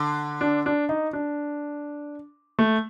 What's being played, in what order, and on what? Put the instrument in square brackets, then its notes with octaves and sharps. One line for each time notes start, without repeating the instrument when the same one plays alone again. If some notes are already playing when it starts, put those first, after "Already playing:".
Already playing: [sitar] D3
[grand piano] D4
D4
D#4
D4
A3